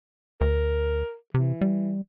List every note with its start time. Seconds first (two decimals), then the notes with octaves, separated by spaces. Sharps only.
0.41 D2 A#4
1.34 C3 E3
1.61 G3